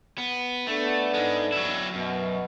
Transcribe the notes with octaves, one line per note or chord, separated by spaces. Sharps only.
B3
A3 B3 D4 A4
G#2 G#3
F#3 E4
F#2 B2